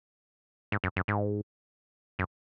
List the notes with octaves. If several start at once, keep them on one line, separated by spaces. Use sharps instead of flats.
G#2
F#2
F#2
G#2
F#2